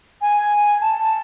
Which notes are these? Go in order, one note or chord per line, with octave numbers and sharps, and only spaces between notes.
G#5
A5